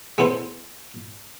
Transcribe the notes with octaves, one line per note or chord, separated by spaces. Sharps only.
G#3 B3 E4 A4 C5